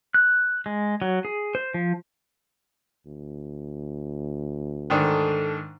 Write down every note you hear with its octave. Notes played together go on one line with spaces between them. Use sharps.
F#6
G#3
F#3
G#4
C5
F3
D2
G#2 D#3 D4 A4